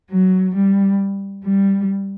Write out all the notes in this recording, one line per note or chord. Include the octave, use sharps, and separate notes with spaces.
F#3
G3
G3